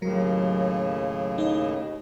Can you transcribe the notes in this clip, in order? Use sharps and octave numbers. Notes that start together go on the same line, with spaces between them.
D#2 A2 C#3 F#3 A#4
D#4 D#5